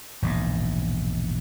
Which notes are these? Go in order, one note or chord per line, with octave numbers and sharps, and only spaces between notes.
E1 A#1 G#2